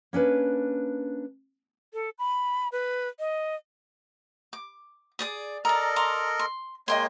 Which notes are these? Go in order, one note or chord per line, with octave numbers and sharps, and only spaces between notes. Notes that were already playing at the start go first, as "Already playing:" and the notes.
A#3 C#4 D4 B4
A4
B5
B4
D#5
D6
G#4 D5 D#6
A4 A#4 D5 D#5 A#5
A#5 C6 D6
C6
G#3 A#3 C#5 D#5 G5 C6